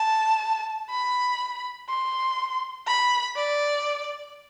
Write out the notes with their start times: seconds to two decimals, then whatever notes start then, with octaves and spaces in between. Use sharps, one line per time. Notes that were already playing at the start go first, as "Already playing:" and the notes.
Already playing: A5
0.91 B5
1.89 C6
2.87 B5
3.36 D5